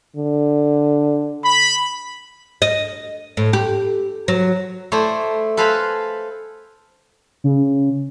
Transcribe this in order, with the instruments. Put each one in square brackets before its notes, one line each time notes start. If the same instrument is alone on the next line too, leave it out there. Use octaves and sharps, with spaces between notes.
[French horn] D3
[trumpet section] B5
[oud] D#5
A2
G4
F#3
[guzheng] A3 E4 C5 D5
A4 B4 C5 F5 G#5 B5
[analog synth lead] C#3